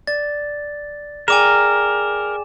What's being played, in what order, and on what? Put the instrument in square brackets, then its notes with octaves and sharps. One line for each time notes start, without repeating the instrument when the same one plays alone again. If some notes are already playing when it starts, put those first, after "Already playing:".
[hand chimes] D5 [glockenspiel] A6
[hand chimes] G#4 D5 G5 [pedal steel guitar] A#4 [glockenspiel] G#5 D6 E7